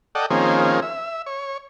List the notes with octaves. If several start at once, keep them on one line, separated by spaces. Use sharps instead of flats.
A4 D5 D#5 F#5 G5
D#3 F3 A#3 C4 C#4 G#4
E5
C#5